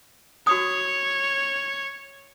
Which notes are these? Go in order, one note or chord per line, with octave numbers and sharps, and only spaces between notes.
F#4 C#5 D#6